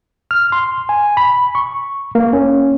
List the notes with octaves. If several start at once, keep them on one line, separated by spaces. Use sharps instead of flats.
F6
C6
G#5
B5
C#6
A#3
C#4